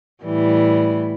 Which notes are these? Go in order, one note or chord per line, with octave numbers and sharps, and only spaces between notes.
A2 E3 G3